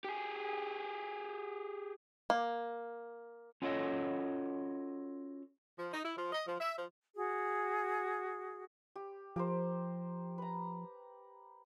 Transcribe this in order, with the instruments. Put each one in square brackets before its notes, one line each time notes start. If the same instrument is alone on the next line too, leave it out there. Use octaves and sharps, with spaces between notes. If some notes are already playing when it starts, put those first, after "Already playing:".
[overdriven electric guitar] G4 G#4
[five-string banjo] A#3
[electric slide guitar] C#4 F4 F#4 A4 C#5 D#5
[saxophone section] F3
D#4
E4
F3
D#5
F3
E5
F3
[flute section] F#4 G#4
[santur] G4
[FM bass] F3 [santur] G4 A#4 C5
[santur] B4 A#5